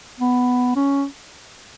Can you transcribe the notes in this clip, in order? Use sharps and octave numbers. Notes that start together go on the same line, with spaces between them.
B3
C#4